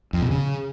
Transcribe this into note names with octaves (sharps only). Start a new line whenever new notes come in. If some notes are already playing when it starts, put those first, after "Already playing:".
F2
B2
C#3